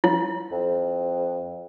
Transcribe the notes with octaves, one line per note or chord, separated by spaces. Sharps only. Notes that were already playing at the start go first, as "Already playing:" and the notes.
E4
F2